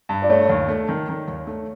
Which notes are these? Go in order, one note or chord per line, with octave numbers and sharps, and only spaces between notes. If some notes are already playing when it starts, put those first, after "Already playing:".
G2
D5
A3 C#5
D#2
A3
D#3
D#3
D#2
A3